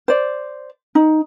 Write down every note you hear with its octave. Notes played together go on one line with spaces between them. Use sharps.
C5 D5
D#4